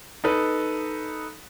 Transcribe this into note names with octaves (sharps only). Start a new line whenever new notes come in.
D#4 A4 B4